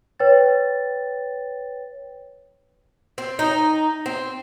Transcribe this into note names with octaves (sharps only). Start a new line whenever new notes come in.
B4 C#5 G5 A6
C4
D#4
C4